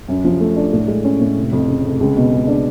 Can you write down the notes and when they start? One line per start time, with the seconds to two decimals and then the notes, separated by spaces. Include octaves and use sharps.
0.08 F#2
0.24 F3
0.40 A3
0.56 D4
0.73 A2
0.88 G#3
1.04 C#4
1.21 A2
1.36 F1
1.52 F2
1.68 C#3
1.84 F1
2.00 C#2
2.16 B2
2.32 G#3
2.47 D4